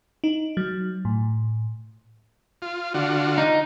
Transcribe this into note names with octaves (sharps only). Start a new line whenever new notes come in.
D#4
F#3
A2
F4
D3 F4 F#4
D#4